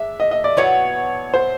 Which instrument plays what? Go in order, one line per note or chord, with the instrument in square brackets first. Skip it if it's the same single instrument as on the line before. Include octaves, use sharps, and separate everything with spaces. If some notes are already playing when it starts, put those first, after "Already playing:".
Already playing: [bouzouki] G#3 D4 [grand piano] E5
[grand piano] D#5
D#5
D5
[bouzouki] B2 F#3 B3 E4 [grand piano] C#5
[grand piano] C5